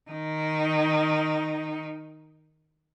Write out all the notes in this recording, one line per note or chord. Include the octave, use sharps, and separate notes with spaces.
D#3 D#4